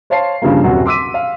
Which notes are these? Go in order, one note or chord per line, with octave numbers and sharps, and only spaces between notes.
C5 C#5 F5 A5 C6 C7
G2 C#3 F3 G3 A#3
D#1 F#2 C3 F#4 F#5
C6 D6 E6 B6 D#7
F5